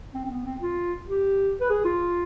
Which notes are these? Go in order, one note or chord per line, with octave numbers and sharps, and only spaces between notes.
C4
C4
B3
C4
F4
G4
B4
G#4
F4